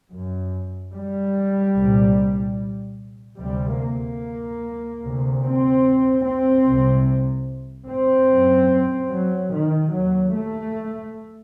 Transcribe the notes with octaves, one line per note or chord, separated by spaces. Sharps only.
F#2
G3
C2 A#2
D2 C3 G3
A#3
D2 C3
C4
C4
C2 C3
C4
F#2
F#3
D#3
D#2 F#3
A3